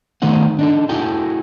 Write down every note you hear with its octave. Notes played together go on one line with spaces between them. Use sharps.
D#3 A3 C4 D#4 F#5
D4 D#4 A4
E4 F#4 G#4 A4 G5